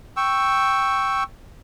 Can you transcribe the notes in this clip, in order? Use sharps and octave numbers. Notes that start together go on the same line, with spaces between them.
G5 C#6 E6